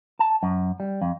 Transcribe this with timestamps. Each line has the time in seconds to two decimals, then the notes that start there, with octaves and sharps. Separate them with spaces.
0.19 A5
0.43 F#2
0.80 G3
1.01 F2